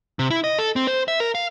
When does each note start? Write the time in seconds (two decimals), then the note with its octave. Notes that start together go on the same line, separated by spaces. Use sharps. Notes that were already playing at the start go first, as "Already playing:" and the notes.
0.19 C3
0.30 E4
0.44 D#5
0.59 A4
0.76 C4
0.87 C5
1.08 E5
1.20 A#4
1.35 F5